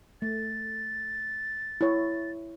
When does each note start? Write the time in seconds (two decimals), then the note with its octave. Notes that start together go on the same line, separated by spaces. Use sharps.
0.22 A3 A6
1.81 E4 C#5